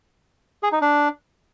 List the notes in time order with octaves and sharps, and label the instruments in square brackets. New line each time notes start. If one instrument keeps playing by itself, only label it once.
[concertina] G#4
D#4
D4